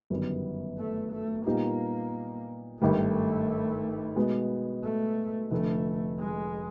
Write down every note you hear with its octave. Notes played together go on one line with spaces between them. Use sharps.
G1 F#2 D#3 G3 B3
A3
A3
A#2 G3 A#3 B3 D#4 G4
G#1 G2 D#3 G3 A3
B2 G#3 B3
A3
F1 F2 D3 A3
G#3